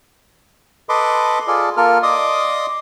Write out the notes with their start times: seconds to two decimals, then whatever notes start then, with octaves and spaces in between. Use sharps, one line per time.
0.89 A4 B4 D#5 B5 C6 D6
1.47 F4 G#4 A4 D5
1.77 A#3 F4 A4 A#4 F6
2.03 D5 D#5 C6 D6 D#6